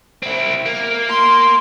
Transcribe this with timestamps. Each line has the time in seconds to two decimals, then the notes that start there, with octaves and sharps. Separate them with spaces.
0.22 C4 E4
0.66 A#3
1.09 C6